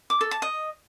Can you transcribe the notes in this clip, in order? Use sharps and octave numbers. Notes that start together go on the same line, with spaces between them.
D6
A4
A5
D#5